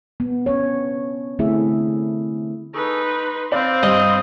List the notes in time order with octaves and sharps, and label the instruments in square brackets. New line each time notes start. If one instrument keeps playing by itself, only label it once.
[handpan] B3
C#4 C#5
D3 A3 C4 E4 G#4 E5
[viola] D#4 B4 [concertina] G#4 A4 C#6
[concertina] C6
[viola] C4 [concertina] C5 F5 B5 [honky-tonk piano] D5
[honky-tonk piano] G2 [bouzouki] D#5